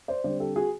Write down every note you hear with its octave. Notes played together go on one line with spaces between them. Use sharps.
C5 D5
D3 G3 C4 C5 D5
G4 A4
F#4 G#4